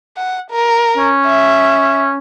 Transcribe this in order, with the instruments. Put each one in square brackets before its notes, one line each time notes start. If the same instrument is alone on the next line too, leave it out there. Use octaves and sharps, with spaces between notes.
[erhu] F#5
A#4
[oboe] C#4
[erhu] E5